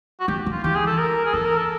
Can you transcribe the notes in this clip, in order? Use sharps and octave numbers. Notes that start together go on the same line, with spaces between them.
F#4
G3 G4
F#3
F4
E3 G4
G#4
A4
A#4
G#4
E3 A4
A#4
A4